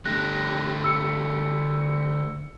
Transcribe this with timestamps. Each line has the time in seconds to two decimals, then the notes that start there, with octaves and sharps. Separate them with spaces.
0.05 D3 A3 G4 F#6 A#6
0.84 E6 C#7